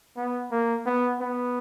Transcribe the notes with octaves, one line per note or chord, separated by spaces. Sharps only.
B3
A#3
B3
B3